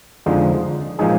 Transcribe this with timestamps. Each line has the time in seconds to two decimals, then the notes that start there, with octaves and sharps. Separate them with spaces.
0.26 F2 D3 F3 G#3 D#4
0.99 A#2 F3 G#3 D#4 G#4